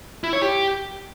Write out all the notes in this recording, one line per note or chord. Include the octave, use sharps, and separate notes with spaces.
E4
C#5
G4